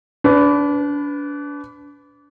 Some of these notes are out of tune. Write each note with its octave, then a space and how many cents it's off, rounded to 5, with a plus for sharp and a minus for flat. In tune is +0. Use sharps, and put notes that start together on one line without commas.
D4 -30 B4 +15